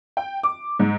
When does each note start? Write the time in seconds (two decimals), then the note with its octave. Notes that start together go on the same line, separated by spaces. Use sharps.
0.17 G5
0.43 D6
0.79 G#2